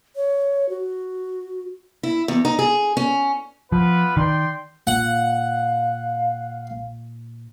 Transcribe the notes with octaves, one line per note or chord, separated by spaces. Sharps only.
C#5
F#4
E4
E2
D#4
G#4
C#4
F3 B3 F4 B4
D#3 D5 G5 C6
A#2 F5 F#5